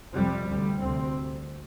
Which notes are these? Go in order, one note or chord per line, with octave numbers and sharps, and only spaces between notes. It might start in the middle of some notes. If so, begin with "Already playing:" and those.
F2 C3 G3
D2 C3
D2 C3 C4